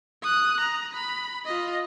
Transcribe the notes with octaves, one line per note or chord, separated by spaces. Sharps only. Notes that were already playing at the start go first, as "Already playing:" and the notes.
D#6 F#6
A#5
B5
F4 D#5